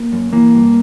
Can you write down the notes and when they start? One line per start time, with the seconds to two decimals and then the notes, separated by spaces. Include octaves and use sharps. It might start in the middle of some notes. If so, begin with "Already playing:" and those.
Already playing: A#3
0.13 F#2
0.33 E3 A#3
0.54 G2